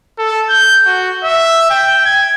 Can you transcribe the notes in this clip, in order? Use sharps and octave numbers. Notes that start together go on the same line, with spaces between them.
A4
G6
F#4
E5
G5
G#6